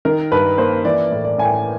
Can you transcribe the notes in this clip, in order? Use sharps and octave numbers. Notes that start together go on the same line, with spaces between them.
D#3 A#4
G2 B4
A#3 C5
E3 D5
A2
D5
A2 G#5
G5